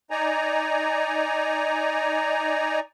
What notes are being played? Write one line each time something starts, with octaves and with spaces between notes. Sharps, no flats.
D#4 D5 G#5 A#5